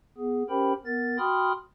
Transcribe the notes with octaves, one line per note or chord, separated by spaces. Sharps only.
B3 G#4
C#4 G4 A#4 C5 G5 B5
B3 A#4 A6
F#4 G5 B5 C6 D#6 F6